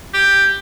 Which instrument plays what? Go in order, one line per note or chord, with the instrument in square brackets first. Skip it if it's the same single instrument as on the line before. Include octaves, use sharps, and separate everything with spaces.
[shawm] G4